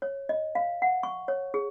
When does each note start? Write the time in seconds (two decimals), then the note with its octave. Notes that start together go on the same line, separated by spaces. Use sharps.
0.02 C#5
0.29 D#5
0.55 F5
0.82 F#5
1.03 C#6
1.28 C#5
1.54 G#4